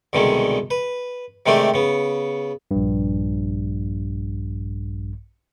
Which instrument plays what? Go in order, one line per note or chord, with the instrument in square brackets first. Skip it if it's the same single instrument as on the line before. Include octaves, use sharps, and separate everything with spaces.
[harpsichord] C2 B2 D3 D#3 G#3
B4
C3 D#3 G#3 A3 D4 G4
C#3 B3
[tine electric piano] A#1 G2